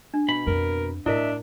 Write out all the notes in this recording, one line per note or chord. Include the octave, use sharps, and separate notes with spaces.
D4
B2 B5
F2 C4 A#4
A2 D4 E4 A#4 D#5 E5